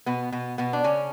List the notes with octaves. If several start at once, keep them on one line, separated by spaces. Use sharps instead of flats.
B2 B3
B2 B3
B2 B3
D4
C#3 C#4